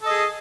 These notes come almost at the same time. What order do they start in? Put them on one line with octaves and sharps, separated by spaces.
A4 D#5 G#4